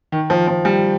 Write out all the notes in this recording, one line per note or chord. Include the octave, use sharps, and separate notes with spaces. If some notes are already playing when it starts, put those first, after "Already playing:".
D#3
F3
F3
G3